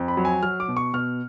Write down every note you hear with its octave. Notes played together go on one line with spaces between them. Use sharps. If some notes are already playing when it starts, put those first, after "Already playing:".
Already playing: F2
B5
F#3
G#5
F#3 F6
D6
B2
C#6
B2 F6